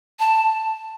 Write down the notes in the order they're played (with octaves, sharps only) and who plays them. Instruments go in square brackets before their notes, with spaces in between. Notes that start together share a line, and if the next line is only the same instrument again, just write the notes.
[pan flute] A5